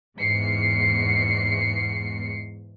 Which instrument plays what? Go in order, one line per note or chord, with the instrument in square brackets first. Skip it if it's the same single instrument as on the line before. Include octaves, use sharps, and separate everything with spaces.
[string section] E2 G#2 [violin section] C7 C#7